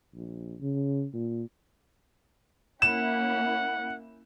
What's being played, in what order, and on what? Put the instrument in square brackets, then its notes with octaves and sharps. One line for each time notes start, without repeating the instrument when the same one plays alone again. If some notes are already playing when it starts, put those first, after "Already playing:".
[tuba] A#1
C#3
A#2
[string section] A#3 C#4 E4 [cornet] F#5 [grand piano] E7